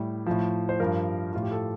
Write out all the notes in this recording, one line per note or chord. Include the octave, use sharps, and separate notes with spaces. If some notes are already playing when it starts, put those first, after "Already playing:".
Already playing: A2 G3
A2 F3
C5
G2 F3 A#4
A2 F3 F4
G4
A4